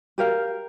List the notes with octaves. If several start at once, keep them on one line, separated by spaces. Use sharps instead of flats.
G4 A#4 F5